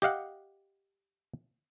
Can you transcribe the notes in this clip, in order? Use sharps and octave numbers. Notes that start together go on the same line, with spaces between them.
G4 D#5 F5 F#5